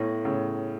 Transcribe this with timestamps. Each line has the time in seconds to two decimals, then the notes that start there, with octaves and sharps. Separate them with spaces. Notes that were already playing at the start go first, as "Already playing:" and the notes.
Already playing: A2 B3 E4 A4 C#5
0.25 A2 C#3